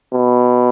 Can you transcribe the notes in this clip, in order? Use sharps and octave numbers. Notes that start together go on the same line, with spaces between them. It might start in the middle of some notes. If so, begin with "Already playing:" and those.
B2